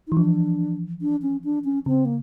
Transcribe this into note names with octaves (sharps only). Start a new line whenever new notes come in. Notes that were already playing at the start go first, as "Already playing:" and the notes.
D#4
E3
F3 D4
D4
C#4
D4
C#4
C#3 C4
A#3